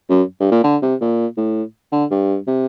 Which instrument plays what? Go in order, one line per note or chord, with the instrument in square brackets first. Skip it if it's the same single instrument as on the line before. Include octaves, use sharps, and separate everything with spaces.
[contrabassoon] F#2
G2
A#2
D3
C3
A#2
A2
D3
G2
C3